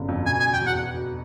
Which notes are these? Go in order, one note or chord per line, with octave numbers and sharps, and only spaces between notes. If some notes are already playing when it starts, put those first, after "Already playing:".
Already playing: G1 C#3
F2
B2 G#5
G#5
E1
G5
E2 F#5